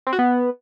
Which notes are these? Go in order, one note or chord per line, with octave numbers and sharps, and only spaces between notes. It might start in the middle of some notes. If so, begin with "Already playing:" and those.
C4
F#4
B3